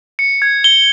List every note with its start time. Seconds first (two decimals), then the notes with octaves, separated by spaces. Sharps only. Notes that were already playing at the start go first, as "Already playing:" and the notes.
0.19 C#7
0.42 G#6
0.64 G7